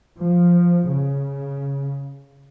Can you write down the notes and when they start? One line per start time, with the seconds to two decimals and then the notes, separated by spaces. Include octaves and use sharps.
0.21 F3
0.90 C#3